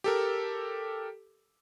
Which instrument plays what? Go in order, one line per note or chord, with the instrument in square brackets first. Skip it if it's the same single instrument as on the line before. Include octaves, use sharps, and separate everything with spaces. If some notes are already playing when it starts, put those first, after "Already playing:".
[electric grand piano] G4 A4 A#4